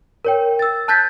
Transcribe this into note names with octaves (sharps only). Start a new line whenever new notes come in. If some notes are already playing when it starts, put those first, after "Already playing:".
A#4 C#5 G5
E6 A6
A5 F#6 G6 A6 B6